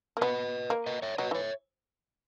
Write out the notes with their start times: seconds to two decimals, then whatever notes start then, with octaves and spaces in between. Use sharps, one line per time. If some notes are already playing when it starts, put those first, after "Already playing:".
0.17 A#3
0.21 B3 B4 D#5
0.70 A#3
0.86 B4 D#5
1.02 C#5 E5
1.18 F#3 B4 D#5
1.31 E3 C#5 E5